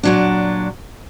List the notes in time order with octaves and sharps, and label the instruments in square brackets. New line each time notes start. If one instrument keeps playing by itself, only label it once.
[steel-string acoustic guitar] A#2 F#3 D4